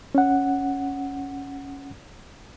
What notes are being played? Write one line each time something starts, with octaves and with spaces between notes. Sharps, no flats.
C#4 F#5